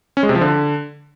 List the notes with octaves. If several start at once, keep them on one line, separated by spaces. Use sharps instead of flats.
C#4
G#3
C3
F3
D3